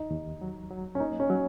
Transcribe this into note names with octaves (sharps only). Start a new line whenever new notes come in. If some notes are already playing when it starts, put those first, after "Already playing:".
Already playing: D#2 D#4
D#2
F#3
F#3
C#4
A#3 D#4
C#4
F#3